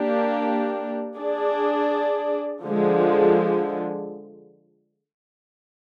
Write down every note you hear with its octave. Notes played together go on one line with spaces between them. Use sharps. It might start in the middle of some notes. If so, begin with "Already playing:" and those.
Already playing: A#3 D4 G4
D4 G#4 D5
D3 F3 G#3